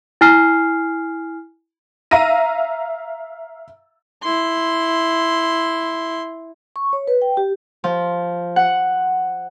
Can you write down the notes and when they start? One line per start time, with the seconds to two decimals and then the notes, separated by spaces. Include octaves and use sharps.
0.21 E4 G#5 F6 C7
2.11 E5 F5 A#5 E6 A#6 D#7
4.23 E4 C6
6.76 C#6
6.93 C#5
7.07 B4
7.22 G5
7.37 G4
7.84 F3
8.56 F#5